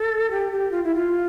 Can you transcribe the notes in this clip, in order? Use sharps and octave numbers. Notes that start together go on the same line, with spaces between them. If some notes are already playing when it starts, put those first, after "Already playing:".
Already playing: A4
G4
G4
F4
E4
F4